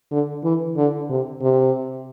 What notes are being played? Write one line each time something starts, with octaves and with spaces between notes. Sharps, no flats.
D3
E3
D3
C3
C3